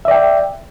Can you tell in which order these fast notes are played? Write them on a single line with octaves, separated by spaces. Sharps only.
E5 D5 G5